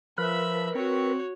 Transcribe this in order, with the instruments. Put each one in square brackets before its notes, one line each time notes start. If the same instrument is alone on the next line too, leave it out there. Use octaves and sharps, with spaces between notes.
[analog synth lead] F3 [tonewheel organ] A#4 B4 [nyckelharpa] E5 B5
[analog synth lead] C4 [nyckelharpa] F#4 C#5